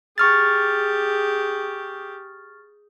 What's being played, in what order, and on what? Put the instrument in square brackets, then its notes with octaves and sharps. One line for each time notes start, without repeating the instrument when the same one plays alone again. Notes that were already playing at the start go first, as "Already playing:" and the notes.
[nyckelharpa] G4 G#4 [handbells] C#6 F6 A6